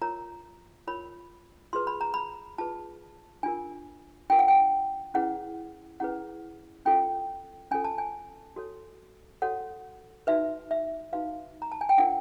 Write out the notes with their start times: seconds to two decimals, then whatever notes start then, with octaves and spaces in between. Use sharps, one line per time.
0.02 F4 A#4 C#5 A#5
0.87 F4 A#4 C#5 B5
1.73 F4 G#4 B4 C6
1.87 B5
2.01 A#5
2.14 B5
2.58 F4 G#4 B4 A5
3.43 D4 F4 A#4 G#5
4.30 D4 F4 A#4 G5
4.39 F#5
4.48 G5
5.14 C#4 E4 G#4 B4 F#5
6.00 C#4 E4 G#4 B4 F#5
6.85 C#4 F4 A4 G5
7.71 C#4 F4 A4 G#5
7.84 A5
7.98 G#5
8.56 F#4 A4 C#5
9.42 F#4 A4 C#5 F#5
10.27 D#4 F#4 B4 E5
10.71 E5
11.13 D#4 F#4 B4 F5
11.62 A#5
11.72 A5
11.81 G#5
11.89 G5
11.98 D4 F4 A#4 F#5